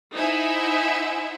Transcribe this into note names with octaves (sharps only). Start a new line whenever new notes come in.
D#4 E4 C5 E5 F#5 G#5